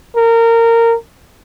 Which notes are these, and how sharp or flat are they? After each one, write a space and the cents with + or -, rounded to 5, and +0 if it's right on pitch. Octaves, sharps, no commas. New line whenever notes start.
A#4 -20